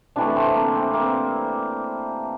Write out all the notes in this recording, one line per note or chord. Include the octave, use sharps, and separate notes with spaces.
C3 E3 A3 D4
C4
A#3
C4
A#3